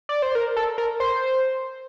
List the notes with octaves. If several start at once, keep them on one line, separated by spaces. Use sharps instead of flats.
D5
C5
A#4
A4
A#4
C5